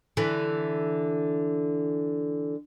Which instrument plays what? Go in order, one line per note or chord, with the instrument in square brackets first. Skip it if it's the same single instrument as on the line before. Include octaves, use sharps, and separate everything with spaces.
[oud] D3 E3